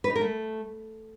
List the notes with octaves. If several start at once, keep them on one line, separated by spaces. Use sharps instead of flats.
B4
D#4
A#4
A3